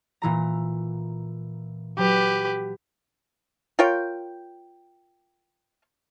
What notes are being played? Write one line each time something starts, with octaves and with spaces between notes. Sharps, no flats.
A#2 E3 A#5
F#3 G4 B4
F4 A#4 C#5 G5